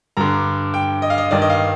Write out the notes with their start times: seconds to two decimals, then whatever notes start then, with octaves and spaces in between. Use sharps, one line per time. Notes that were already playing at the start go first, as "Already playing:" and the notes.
0.17 G2 D3 A#5
0.74 G5
1.02 D#5
1.10 F5
1.18 D#5
1.31 G2 D#3 D5
1.42 D#5
1.50 F5